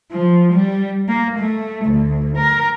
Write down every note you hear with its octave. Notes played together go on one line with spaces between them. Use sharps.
F3
G3
A#3
A3
D2
A#4